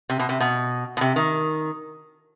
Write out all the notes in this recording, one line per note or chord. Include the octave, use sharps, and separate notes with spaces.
C3
B2
C3
B2
B2
C3
D#3